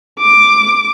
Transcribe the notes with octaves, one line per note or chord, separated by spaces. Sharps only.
D6